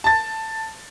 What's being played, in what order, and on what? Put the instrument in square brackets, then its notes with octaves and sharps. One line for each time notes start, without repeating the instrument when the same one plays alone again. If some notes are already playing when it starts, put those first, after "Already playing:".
[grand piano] A5 A6